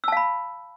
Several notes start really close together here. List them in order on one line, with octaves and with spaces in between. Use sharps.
E6 A5 F5 B5